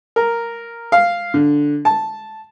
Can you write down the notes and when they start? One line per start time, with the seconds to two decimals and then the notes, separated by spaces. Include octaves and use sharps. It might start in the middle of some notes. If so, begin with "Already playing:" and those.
0.16 A#4
0.92 F5
1.34 D3
1.85 A5